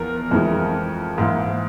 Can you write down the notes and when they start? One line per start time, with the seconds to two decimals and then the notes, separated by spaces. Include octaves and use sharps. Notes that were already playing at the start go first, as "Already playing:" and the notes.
Already playing: E2 F3 A#4
0.31 F2 E3 G#3
1.18 G#2 E3 A#3